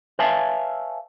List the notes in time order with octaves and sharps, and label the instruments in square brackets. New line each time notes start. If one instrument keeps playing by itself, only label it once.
[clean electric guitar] B4 C#5 E5 F5 G#5 A5